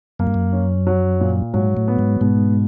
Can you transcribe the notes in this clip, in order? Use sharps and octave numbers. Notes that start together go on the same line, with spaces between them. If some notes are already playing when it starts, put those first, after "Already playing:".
F#2 A#3
G2
F#2
C#4
F#3
A#2
G#2 F#3
A2
B3
G#2
G#2 B2